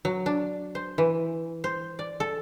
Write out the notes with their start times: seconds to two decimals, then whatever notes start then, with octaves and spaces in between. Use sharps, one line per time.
0.05 F#3
0.26 D4
0.75 C5
0.98 E3
1.64 C5
1.99 D5
2.20 A4